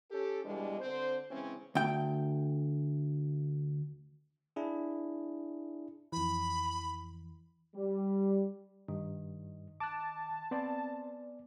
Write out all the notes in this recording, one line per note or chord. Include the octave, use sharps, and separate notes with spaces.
C#4 G4 A4
B2 E3 G3 G#3 D4
D3 C4 C5
C#3 E3 G#3 C4 C#4
D2 G5
D4 E4 G#4
F2 E3 B5
G3
G2 D#3
A5 D6 F#6
B3 C4 D5